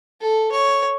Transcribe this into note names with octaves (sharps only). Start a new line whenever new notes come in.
A4
C#5